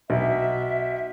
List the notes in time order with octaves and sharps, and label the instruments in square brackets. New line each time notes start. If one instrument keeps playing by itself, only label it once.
[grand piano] B1 [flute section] E5